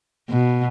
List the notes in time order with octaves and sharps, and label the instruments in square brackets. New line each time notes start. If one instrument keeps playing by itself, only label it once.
[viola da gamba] B2